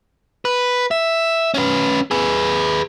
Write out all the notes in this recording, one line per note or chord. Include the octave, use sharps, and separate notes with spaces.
B4
E5
C#4 B4
G#4 B4